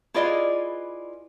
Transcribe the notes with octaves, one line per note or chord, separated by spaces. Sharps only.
E4 F4 G#4 B4 D5 D#5